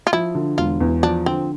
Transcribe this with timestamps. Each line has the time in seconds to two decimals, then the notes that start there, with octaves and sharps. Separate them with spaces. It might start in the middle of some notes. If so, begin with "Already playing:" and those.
0.07 F4
0.13 F3 E4
0.35 D3
0.58 E1 F4
0.80 E2
1.03 F3 D4
1.26 D3 C4